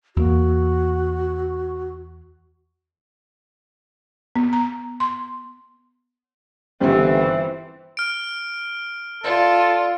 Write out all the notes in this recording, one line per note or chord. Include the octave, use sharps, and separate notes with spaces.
E2 A#3 F#4
B3
A#5
C6
G1 G2 C#3 E3 G3 C4
F6 D7
A2 F4 A4 D5 E5